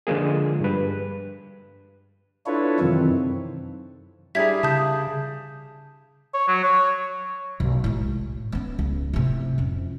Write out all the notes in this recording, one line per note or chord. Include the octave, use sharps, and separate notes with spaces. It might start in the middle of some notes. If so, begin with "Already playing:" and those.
D3 F3 G#3 A#3 G#4
G2 B4
D4 E4 F4 A4 B4 C#5
F#2 C3 D#3 E3 C4
G3 D4 E4 G#4 A#4 G#6 B6
C#3 A5 D#6 G6
C#5
F#3
C#5
B1
A2 G#3
B3 C#4
C#2
A2 C3
F2 C#4